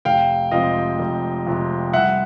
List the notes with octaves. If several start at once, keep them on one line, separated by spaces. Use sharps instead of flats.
F1 F5 G5
F2 C3 F3 G#3 D#5 F5
F1
F2 C3 F3 G#3
C2 E5 F#5